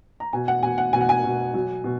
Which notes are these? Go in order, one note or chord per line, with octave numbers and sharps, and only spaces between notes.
A#5
B2 G#5
F#5
B2 G#5
F#5
B2 G#5
F#5
G#5
B2
F#3
B2